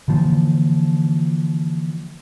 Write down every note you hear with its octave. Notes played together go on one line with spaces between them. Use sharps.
D3 E3 F3 A#3